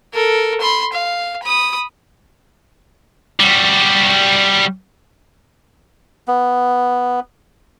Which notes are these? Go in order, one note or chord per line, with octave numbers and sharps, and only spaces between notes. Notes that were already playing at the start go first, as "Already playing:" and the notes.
A4 A#4
B5 C6
F5
B5 D#6
G3 F#4
B3